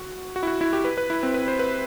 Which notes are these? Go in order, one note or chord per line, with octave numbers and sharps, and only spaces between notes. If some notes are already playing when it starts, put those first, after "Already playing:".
Already playing: F#4
F#4
E4
F#4
E4
G4
B4
B4
E4
C4
B4
C5
B4